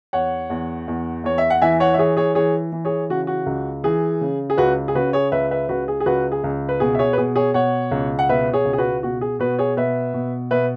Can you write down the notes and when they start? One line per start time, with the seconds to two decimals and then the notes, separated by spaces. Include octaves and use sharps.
0.13 E2 C#5 F#5
0.50 E2
0.88 E2
1.24 E2 C#5
1.38 E5
1.50 F#5
1.61 E3 E5 G#5
1.80 C#5 F#5
1.94 E5
1.98 E3 G#4 C#5
2.17 G#4 C#5
2.35 E3 G#4 C#5
2.72 E3
2.85 G#4 C#5
3.10 C#3 F#4
3.27 F#4
3.46 C#2
3.84 E3 G#4
4.21 C#3
4.50 G#4
4.57 C#2 F#4 B4
4.88 G#4
4.95 C#3 F#4 B4
5.13 G#4 C#5
5.32 C#2 B4 E5
5.51 B4 E5
5.69 C#2 F#4 B4
5.88 G#4
6.00 G#4
6.06 C#2 F#4 B4
6.32 G#4
6.44 C#2
6.69 B4
6.80 B2 G#4
6.95 E5
6.99 G#4 C#5
7.13 B4
7.18 B2 G#4
7.36 G#4 C#5
7.54 B2 C#5 F#5
7.91 C#2
8.19 F#5
8.29 B2 B4 E5
8.53 G#4 C#5
8.65 C#2
8.73 G#4
8.78 F#4 B4
9.03 B2 F#4
9.21 G#4
9.39 B2 F#4 B4
9.58 G#4 C#5
9.77 B2 B4 E5
10.14 B2
10.51 B2 B4 E5